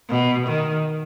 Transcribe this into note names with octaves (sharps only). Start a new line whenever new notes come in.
B2
D#3